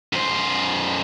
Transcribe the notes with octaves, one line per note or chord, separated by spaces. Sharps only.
F#2 C5